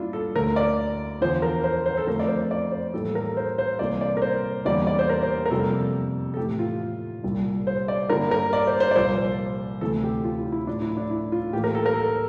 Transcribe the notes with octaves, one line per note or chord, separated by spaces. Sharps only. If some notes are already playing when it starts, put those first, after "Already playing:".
Already playing: G2 A#3 D4 E4 F4
A4
D2 D3 A3 A#4
D5
E2 D3 F3 C5
A#4
C5
C5
A4
F2 D3 A3 A#4
D5
C5
D5
C5
A2 E3 G3 A#3 A4
A4
A#4
C5
C5
C2 C3 E3 A#3 D5
D5
A#4
C5
E2 D3 G3 A#3 D5
D5
C5
A#4
C5
A#4
F2 C3 G3 A#3 A4
A4
A2 E3 A3 G4
F4
C2 A#2 G3
C5
D5
G2 D3 G3 A#3 A#4
A#4
D5
C5
C5
D5
C2 A#2 F3 A#3 C5
D2 C3 E3 A3 A4
G4
F4
E4
E4
A2 F3 A3 D4
E4
D4
E4
F4
A2 E3 A#3 G4
A#4
A4
A#4
A4